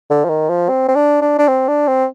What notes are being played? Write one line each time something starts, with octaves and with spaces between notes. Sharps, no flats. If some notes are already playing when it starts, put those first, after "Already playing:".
D3
F3
D#3
F3
C4
C4
D4
D4
D4
C4
D4
C4